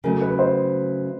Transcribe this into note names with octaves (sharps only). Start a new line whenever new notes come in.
C#3 F#3 A3 A#4
B4
C5